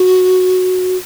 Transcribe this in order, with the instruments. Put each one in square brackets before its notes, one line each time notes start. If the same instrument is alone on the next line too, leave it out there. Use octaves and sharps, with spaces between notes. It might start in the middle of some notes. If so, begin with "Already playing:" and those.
Already playing: [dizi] F#4